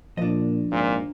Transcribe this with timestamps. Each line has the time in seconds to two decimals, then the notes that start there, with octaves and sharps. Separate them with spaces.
0.17 A#2 F3 D4 D#5
0.72 G#1 A#2